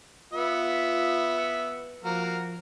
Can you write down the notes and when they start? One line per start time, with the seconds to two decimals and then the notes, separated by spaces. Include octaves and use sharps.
0.33 B3 F4 E5
2.04 F3 A#3 F#4 A#4